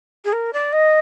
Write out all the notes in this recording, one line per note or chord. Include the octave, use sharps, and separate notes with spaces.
G#4
A#4
D5
D#5